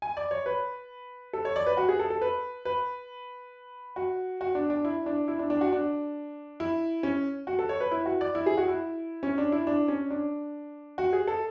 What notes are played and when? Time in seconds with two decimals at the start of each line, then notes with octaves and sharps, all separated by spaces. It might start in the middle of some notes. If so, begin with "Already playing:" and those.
0.02 G#5
0.17 D5
0.31 C#5
0.46 B4
1.33 A4
1.45 C#5
1.56 D5
1.66 B4
1.77 F#4
1.89 G#4
1.99 A4
2.10 A4
2.22 B4
2.65 B4
3.96 F#4
4.41 F#4
4.55 D4
4.70 D4
4.85 E4
5.06 D4
5.28 E4
5.39 D4
5.50 D4
5.61 F#4
5.72 D4
6.60 E4
7.03 C#4
7.47 F#4
7.59 A4
7.69 C#5
7.80 B4
7.92 E4
8.06 F#4
8.21 D5
8.35 E4
8.46 G#4
8.57 F#4
8.68 E4
9.23 C#4
9.38 D4
9.52 E4
9.67 D4
9.88 C#4
10.11 D4
10.98 F#4
11.13 G#4
11.27 A4